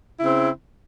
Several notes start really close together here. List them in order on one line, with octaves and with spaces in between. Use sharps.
E4 C#3 C4